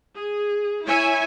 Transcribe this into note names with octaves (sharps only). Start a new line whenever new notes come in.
G#4
E4 C#5 E5 G#5